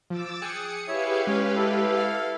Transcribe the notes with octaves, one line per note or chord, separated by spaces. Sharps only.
F3 D6 E6 A6
G#4 G5 D#6 F#6 C#7
E4 G4 B4 C#5 E5 F5
G#3 C#4 C#5
E4 A4
F5